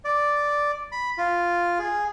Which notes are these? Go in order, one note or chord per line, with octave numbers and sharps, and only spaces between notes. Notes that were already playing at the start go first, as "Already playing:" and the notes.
D5
B5
F4
G#4